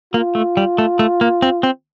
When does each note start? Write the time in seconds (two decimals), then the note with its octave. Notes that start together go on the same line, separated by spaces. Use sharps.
0.14 A#3 F4
0.35 A3
0.57 G3
0.78 A3
0.99 A3
1.21 A#3
1.42 C4
1.63 C4